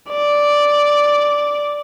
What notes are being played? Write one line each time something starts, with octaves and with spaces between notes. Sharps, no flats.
D5